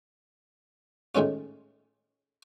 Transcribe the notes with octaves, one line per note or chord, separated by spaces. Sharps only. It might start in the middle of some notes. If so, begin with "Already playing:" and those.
A2 D#3 G#3 C#4 F4